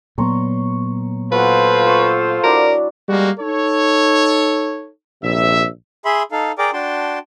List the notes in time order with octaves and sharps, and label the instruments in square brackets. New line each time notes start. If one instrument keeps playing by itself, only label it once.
[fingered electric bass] A#2 F#3 B3 [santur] C#5 A#5 C6
[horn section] F4 A4 C5 [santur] F#4 F#5 [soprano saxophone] B4
[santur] C#6 E6
[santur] F#3 D4 E4 [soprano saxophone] A#4
[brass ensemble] G3 G#3 A#3 F#4
D#4 A4 C#5
A#1 C3 E5
[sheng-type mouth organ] G#4 E5 B5 C6
D#4 A4 F5
G#4 A#4 D5 G5 A#5 D6
D4 F#4 G5 A5 C6